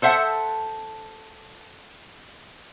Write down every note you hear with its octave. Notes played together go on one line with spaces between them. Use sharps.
A4 C5 E5 F#5 A5